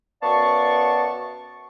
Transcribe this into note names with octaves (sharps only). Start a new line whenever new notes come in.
F#2 B3 D5 F5 A5 C#6